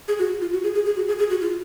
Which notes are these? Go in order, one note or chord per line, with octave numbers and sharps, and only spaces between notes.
G#4
F#4
F4
F#4
G#4
G#4
G#4
F#4
G#4
G#4
F#4
F4